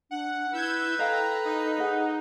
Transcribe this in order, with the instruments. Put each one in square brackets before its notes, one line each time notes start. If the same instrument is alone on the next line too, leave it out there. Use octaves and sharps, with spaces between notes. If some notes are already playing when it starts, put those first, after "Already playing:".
[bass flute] D4 [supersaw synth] F#5
[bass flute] E4 [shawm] B4 [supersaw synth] E6 G6 G#6
[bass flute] A4 [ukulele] D#5 F5 G5 [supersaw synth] A#5
[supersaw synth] D#4
[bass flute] G#4 [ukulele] D#5 F#5